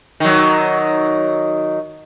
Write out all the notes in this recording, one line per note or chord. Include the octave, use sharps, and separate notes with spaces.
D#3 F#3